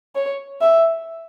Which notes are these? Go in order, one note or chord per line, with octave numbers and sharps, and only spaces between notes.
C#5
E5